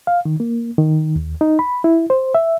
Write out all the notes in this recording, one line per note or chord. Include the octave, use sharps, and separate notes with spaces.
F5
D#3
A#3
D#3
D#2
D#4
B5
E4
C5
E5